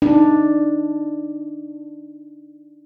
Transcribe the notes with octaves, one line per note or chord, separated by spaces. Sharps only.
D4 D#4